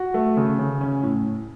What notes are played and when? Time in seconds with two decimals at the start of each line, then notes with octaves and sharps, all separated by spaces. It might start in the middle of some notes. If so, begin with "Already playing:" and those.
Already playing: F#4
0.14 A3
0.37 C#3
0.59 C#3
0.81 C#4
1.03 A2